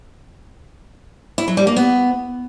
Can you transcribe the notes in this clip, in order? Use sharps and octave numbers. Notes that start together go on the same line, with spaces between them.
E4
F#3
G3
A#3
B3